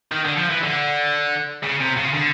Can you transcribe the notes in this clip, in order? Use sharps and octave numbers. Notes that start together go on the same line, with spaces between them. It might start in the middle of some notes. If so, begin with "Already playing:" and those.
D#3
D3
F3
E3
D3
C#3
C3
C#3
D3